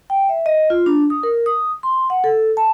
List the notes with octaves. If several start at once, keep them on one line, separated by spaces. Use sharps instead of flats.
G5
E5
D#5
F4
D4
D#6
A#4
D#6
C6
F#5
A4
A5